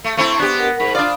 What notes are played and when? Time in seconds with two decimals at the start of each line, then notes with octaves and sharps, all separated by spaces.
0.04 A3
0.17 A3 C4 E4 C#6
0.40 B3 D4 G4
0.59 A#4 F#5
0.80 G#2 B5
0.95 D4 F4 D5 F5 B5 D#6